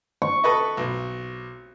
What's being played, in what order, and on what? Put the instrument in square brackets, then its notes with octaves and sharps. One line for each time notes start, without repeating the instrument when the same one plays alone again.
[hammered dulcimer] C#6
[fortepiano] A4 B4 D#5
B1